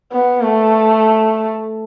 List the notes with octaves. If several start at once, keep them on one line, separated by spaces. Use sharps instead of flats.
B3
A3